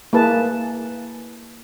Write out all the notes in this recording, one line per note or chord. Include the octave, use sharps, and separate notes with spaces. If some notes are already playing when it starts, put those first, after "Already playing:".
A#3 E4 G#4 B4 A5